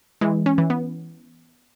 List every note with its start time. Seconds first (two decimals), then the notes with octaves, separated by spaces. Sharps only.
0.21 E3 G#3
0.46 C#4
0.58 E3
0.70 B3